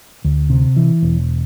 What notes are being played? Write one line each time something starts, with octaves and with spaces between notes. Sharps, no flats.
D2
C3
E3
E1